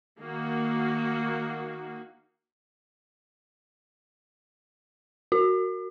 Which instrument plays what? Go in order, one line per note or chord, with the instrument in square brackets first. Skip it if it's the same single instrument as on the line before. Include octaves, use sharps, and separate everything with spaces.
[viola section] D#3 A#3 F#4
[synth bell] F#4